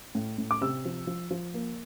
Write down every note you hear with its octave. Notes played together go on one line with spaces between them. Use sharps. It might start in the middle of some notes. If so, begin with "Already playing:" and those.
A2
A2
D6
C3 E6
F3
F3
F3
A#3